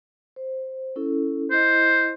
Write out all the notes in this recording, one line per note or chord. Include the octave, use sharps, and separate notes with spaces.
C5
C#4 E4 A4
E4 C5 D#5